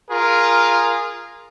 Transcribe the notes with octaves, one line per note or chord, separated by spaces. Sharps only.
F4 G#4 A#4